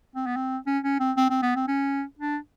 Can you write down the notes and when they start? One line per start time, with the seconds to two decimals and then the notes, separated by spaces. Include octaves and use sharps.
0.16 C4
0.26 B3
0.36 C4
0.67 C#4
0.84 C#4
1.00 C4
1.17 C4
1.30 C4
1.43 B3
1.56 C4
1.68 C#4
2.19 D4